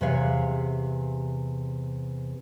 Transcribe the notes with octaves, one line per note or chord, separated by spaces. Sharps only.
E2 C3 G4 B4 C#5 F5